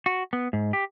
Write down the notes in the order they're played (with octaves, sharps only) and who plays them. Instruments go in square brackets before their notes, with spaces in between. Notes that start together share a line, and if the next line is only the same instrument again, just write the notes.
[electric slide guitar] F#4
B3
G#2
G4